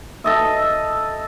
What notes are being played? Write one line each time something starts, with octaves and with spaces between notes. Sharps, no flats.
A4 D#5 E5